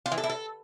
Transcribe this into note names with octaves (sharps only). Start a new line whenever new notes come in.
F4
E3
A4
E4
A4